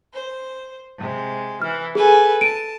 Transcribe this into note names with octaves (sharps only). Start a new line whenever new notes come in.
C5
C3 G#3
E3 F6
G#4 A4 B4 G#5
A5 D7 D#7